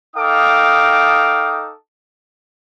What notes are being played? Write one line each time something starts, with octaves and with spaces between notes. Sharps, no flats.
D#4 A4 F5 G5 D6 D#6